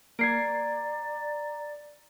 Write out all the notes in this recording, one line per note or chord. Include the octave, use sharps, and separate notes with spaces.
A#3 D5 A#5 G#6 C7 D7